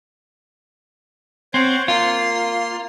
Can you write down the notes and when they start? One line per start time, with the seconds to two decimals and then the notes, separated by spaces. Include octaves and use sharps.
1.54 C4 C5 C#5 F#5
1.88 A#3 F4 C6